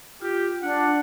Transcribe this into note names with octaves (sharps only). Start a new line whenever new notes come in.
F4 G4
D4 F#5